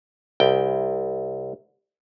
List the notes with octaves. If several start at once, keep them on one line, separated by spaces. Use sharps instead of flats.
C2 G5